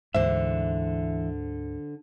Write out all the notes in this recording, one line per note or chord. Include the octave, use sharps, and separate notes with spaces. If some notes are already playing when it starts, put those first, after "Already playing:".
D2 G#2 D3 E3 C5 E5